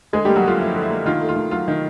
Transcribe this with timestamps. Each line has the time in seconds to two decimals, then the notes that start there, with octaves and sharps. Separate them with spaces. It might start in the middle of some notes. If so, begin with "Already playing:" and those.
0.13 D3 G#3 G#4
0.25 G3 A#3 G4
0.36 F#3 F#4
0.44 D3 F4
0.59 F3 E4
0.74 D3
0.83 E4
0.90 A#3
1.06 D#3 F4
1.21 A3
1.29 F4
1.36 D#3
1.51 F#3 F4
1.68 D#3